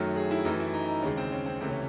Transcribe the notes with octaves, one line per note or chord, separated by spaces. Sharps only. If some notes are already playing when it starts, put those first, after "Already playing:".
Already playing: F#2 D#3 F#3 A3
G#4
E4
F#2 E3 A3 D#4
E4
D#4
D#4
D#2 C#3 G#3 C#4
C4
C#4
C4
C#2 C3 E3 A3 C4
C#4